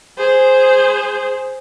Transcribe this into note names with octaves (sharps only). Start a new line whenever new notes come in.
G#4 C5